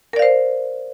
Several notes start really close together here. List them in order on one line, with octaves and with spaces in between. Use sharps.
A#4 D5 F5 C5